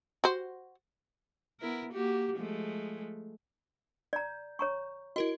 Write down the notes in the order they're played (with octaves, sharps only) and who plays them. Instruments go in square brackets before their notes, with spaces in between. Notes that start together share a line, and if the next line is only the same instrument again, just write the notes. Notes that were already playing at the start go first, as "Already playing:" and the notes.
[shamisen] F#4 C5
[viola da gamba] B3 E4 A#4
A#3 F#4 G4
F3 G#3 A3
[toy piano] D5 A#5 [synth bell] G6
[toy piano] C#5 A#5 C#6
[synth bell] E4 A#4 D#5 [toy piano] F#4